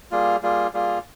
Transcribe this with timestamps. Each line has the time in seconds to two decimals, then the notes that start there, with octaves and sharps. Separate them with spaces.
0.11 G3 A#3 F4 G#4
0.43 G3 A#3 F4 G#4
0.73 G3 A#3 F4 G#4